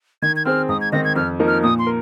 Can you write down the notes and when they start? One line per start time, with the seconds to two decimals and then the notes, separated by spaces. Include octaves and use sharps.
0.22 D#3 G#6
0.36 G#6
0.45 C4 G#4 C5 F6
0.69 G#2 D#6
0.81 G#6
0.92 D#3 C4 D#4 A#6
1.05 G#6
1.16 F2 F6
1.39 F3 A#3 D#4 A#4
1.47 F6
1.63 A#2 D#6
1.79 C6
1.87 A#4